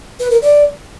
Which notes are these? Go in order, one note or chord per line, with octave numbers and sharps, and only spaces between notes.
B4
A#4
D5